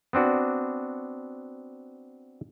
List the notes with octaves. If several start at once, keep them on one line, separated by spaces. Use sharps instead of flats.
B3 C4 D4 F#4